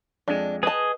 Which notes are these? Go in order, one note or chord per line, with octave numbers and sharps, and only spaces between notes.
F2 G#3 D4
G#4 B4 D#5 A5